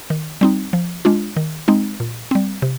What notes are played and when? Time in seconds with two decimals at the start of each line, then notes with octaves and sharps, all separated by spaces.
0.10 D#3
0.41 G3 C4 D#4
0.73 F3
1.05 G#3 D4 F4
1.37 D#3
1.68 G#3 C4 D#4
2.00 A#2
2.31 G3 C4
2.62 C3